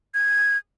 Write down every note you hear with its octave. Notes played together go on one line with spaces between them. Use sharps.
G#6